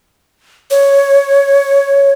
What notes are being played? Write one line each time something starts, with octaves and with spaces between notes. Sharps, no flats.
C#5